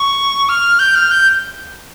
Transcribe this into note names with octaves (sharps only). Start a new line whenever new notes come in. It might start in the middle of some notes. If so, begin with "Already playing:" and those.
Already playing: C#6
F6
G6
F6
G6